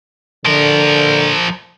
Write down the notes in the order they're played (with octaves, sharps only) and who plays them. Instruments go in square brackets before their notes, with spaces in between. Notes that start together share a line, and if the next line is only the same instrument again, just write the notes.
[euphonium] D3 [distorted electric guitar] F3 A#4